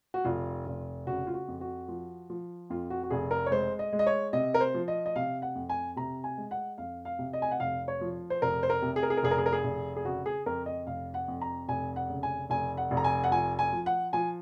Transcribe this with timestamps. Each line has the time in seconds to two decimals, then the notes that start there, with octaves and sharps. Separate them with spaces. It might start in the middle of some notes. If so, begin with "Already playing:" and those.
0.14 F#4
0.25 F1 F4
0.66 F1
1.07 C#3 F#4
1.27 F4
1.34 F#4
1.48 F2
1.61 F#4
1.88 F3
2.30 F3
2.70 F2 F4
2.90 F#4
3.03 F#4
3.10 F1 G#4
3.31 A#4
3.46 C#5
3.51 G#3 C5
3.79 D#5
3.93 G#3
3.99 D#5
4.07 C#5
4.33 C3 D#5
4.54 A#4
4.60 C5
4.74 F3
4.88 D#5
5.06 D#5
5.16 C3 F5
5.42 F#5
5.55 F2
5.69 G#5
5.96 C3 A#5
6.24 G#5
6.37 G#3
6.51 F#5
6.78 F2 F5
7.05 F5
7.19 C3
7.33 D#5
7.42 G#5
7.51 F#5
7.60 F1 F5
7.88 C#5
8.01 F3
8.30 C5
8.42 F1 A#4
8.63 C5
8.70 A#4
8.82 C3
8.96 G#4
9.03 A#4
9.10 G#4
9.17 A#4
9.23 F1 G#4
9.31 A#4
9.38 G#4
9.46 A#4
9.53 G#4
9.64 F1
9.96 G#4
10.05 C#3 F#4
10.26 G#4
10.46 F2 A#4
10.66 D#5
10.87 F1 F5
11.14 F#5
11.28 F2
11.41 A#5
11.68 F1 G#5
11.96 F#5
12.09 C#3
12.23 G#5
12.50 F1 G#5
12.77 F#5
12.91 F1
12.97 A#5
13.04 G#5
13.24 F#5
13.31 F3 G#5
13.59 G#5
13.72 F3
13.86 F#5
14.13 F3 G#5